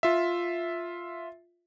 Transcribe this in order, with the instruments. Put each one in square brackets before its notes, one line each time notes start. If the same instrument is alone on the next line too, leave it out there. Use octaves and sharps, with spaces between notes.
[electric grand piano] F4 E5